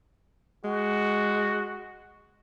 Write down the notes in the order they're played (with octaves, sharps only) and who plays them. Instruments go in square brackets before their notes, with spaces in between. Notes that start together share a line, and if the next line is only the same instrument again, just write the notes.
[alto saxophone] G#3 [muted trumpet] F#4